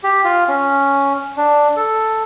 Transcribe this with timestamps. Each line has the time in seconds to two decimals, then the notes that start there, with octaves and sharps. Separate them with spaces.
0.03 G4
0.24 F4
0.48 C#4
1.37 D4
1.76 A4